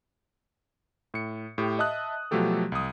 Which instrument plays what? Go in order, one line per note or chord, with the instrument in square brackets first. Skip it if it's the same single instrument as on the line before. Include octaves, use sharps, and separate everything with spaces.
[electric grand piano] A2 C#7
A2 G4
D#5 E5 A5 D#6 F#6
B2 F3 F#3 A3 G4 A4
C2 D#6